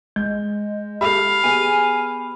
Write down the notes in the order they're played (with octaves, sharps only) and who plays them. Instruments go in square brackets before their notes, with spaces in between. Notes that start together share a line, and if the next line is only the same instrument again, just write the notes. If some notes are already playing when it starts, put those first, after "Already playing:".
[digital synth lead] G#3 [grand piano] G6
[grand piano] G4 A4 [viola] F5 [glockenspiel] B5
[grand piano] B3 G4 G#4 [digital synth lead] G#5